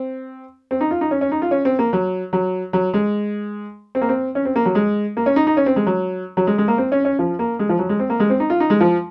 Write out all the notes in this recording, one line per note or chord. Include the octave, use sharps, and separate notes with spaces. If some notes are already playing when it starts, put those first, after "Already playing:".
Already playing: C4
C4
D#4
F4
D#4
C#4
C#4
D#4
F4
C#4
C4
A#3
F#3
F#3
F#3
G#3
C4
A#3
C4
C#4
C4
A#3
F#3
G#3
A#3
C#4
D#4
D#4
C#4
C4
G#3
F#3
F#3
G#3
G#3
A#3
C4
C#4
C#4
F3
A#3
G#3
F3
F#3
G#3
C4
A#3
G#3
C4
D#4
F4
D#4
G#3
F3